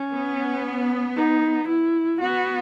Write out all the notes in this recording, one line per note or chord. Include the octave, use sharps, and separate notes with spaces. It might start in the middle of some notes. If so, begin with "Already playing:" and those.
Already playing: C#4
B3
D#4
E4
B3 F#4